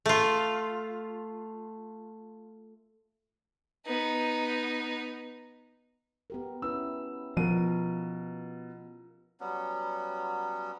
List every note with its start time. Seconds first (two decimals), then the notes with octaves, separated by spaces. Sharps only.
0.06 A3 F4
3.86 B3 D#4
6.30 B3 G4 A#4
6.62 C#4 E4 B4 E6
7.37 B2 F3 F4 A#4 D#7
9.40 F#3 G3 B3 C#4